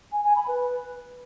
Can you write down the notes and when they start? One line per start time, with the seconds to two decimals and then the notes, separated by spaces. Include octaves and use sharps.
0.12 G#5
0.24 G#5
0.36 B5
0.48 B4